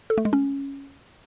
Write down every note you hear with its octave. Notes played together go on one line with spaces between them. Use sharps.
A4
A3
G#3
C#4